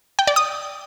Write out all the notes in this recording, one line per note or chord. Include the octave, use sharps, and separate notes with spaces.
G5
D5
D#6